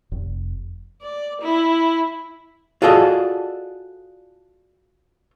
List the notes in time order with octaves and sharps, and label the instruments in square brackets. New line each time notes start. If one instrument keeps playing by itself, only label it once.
[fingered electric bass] F1
[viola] D5
E4
[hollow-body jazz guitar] F4 F#4 G#4 A4 D5 D#5